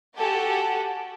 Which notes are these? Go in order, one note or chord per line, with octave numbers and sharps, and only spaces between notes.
F#4 G4 A4 F#5 G#5 A5